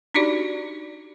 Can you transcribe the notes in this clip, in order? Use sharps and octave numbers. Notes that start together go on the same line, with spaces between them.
D4 D#4 F#4 G4 D5